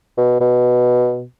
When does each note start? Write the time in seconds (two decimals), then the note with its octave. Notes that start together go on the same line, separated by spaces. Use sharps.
0.17 B2
0.40 B2